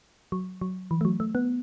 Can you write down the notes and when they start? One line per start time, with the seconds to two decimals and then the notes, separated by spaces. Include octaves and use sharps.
0.32 F#3
0.61 F#3
0.91 E3
1.01 A3
1.05 F#3
1.20 A3
1.35 B3